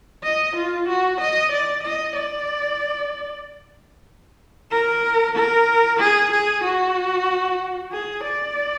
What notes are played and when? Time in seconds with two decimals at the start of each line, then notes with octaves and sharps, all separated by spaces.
0.23 D#5
0.55 F4
0.88 F#4
1.20 D#5
1.51 D5
1.83 D#5
2.15 D5
4.71 A#4
5.35 A#4
5.99 G#4
6.31 G#4
6.63 F#4
7.92 G#4
8.23 D5